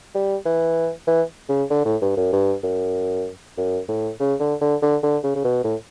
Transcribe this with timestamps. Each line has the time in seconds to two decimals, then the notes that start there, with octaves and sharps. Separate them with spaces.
0.15 G3
0.46 E3
1.07 E3
1.49 C#3
1.70 D3
1.85 A2
2.02 G2
2.17 F#2
2.33 G2
2.63 F#2
3.58 F#2
3.89 A2
4.20 C#3
4.40 D3
4.61 D3
4.82 D3
5.03 D3
5.24 C#3
5.36 C#3
5.44 B2
5.64 A2